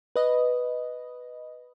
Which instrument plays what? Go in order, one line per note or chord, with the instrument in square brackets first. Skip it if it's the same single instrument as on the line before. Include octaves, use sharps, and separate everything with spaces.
[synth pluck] B4 D#5